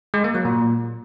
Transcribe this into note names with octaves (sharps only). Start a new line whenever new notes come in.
G#3
A#3
F#3
A#2